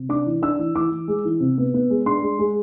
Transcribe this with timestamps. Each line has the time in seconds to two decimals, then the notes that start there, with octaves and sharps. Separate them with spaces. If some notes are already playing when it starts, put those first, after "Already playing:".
Already playing: C3
0.09 D4 D6
0.26 E3
0.42 D4 E6
0.59 E3
0.75 E3 D6
0.92 E3
1.08 G#3
1.25 E3
1.40 C3
1.58 B3
1.74 B3
1.90 G#3
2.06 D4 C6
2.22 G#3
2.39 G#3